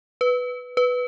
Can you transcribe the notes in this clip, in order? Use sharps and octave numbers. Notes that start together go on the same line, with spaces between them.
B4
B4